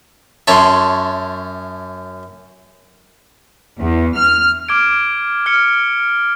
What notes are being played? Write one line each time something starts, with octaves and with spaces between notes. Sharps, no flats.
F#2 C#5 E5 A5 C6
E2
F6
D6 F6 G#6 D7
F6 C#7